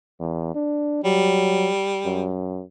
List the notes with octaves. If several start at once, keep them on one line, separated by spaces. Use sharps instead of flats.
E2
D4
F#3 G3
F#2